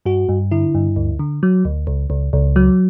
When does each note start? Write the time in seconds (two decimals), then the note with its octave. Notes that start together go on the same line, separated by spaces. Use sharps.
0.06 G2 F#4
0.29 G2
0.51 D3 E4
0.75 G2
0.96 D2
1.19 D3
1.43 F#3
1.65 D2
1.87 C#2
2.10 C#2
2.33 C#2
2.56 F#3